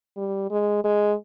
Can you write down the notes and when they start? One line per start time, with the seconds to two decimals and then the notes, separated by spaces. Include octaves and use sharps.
0.17 G3
0.51 G#3
0.84 G#3